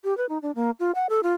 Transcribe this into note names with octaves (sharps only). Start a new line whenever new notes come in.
G4
B4
D#4
D4
A#3
F4
F#5
A4
F4